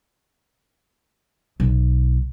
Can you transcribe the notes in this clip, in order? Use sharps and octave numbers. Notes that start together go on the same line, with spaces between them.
B1